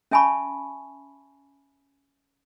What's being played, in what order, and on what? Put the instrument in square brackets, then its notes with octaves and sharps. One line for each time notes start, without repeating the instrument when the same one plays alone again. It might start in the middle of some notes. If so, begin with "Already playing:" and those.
[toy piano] C#4 E5 G#5 A5 B5 C#6